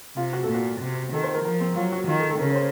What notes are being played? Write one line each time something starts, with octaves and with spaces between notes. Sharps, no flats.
C3 F4
F#4
A4
A#2
F#4
C3
D#3 A4
C5
A#4
F3 A#4
C4
F#3 F4
F#4
D#3 F4
A4
A4
C#3 A#4
C#5
C5